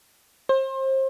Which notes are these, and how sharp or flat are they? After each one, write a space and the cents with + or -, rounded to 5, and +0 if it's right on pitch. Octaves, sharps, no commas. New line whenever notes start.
C5 +30